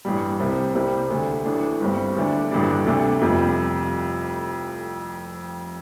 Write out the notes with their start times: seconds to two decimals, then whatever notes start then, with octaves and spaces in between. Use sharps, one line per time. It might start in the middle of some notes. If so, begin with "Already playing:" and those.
0.05 A1 G2 G3
0.40 C2 C3 G3 C4
0.75 C2 C3 G3 C4
1.10 D2 D3 A3
1.45 A1 A2 A3 D4
1.80 G1 G2 G3 C4
2.16 D2 D3 A3 D4
2.51 A1 G2 D3 G3 D4
2.86 D2 C3 A3 D4
3.21 F1 F2 C3 G3